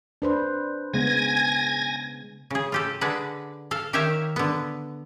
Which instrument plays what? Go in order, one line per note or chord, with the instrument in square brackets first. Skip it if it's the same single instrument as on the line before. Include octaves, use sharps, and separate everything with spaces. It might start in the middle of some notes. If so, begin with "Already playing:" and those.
[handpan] D4 B4 C5
[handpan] C#3 G#3 B3 [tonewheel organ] G#5 G#6 A#6
[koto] C#3 G#4
F4 G4 A4
D3 D4 G#4 B4 F#5
A4 F5
D#3 G4 C#5 E5 F5 A#5
D3 B3